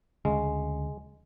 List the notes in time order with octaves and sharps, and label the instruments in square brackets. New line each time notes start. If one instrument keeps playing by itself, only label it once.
[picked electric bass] D2 C#3 [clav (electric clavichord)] G#3